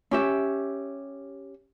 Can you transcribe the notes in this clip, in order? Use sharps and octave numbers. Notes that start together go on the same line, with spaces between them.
C#4 G4 E5